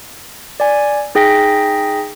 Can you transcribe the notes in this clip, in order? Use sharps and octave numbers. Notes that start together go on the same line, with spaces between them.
D5 G#5
D#4 G#4 G5 A#6 B6